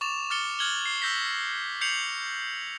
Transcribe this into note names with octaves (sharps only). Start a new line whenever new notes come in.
C#6 D6 A6 E7 F7
D6 F6 A6 C#7 G7
F6 F#6 G#6 F#7 G7
C7
E6 G6 A#6 B6
G6 C7 C#7 F7 F#7